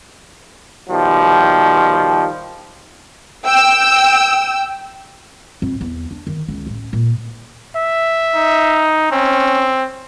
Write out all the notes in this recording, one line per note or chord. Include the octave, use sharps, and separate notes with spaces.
B2 D#3 F3 G3
G5 E6
F2
E2
D4
D#3
C#2
A1
A#2
E5
D#4
C4 C#4